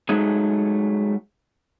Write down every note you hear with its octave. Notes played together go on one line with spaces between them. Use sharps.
F#3 G#3 A3 D#4 G#4